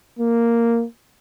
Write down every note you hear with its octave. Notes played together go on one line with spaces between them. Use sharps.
A#3